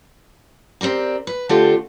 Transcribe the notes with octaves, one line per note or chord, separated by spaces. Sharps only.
C4 G4 A#4 D5
B4
D3 A3 C4 F4 G4 A4